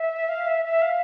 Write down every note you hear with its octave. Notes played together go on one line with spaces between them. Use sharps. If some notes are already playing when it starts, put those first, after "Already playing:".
Already playing: E5
F5
E5
E5
F5